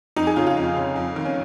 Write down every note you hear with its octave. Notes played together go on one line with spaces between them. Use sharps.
F2 D#4
G#4
C#3 F4
F4
F2
C#3
F2
D#3
C#4